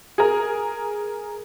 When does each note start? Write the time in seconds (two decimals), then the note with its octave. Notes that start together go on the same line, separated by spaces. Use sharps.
0.18 G#4 A#4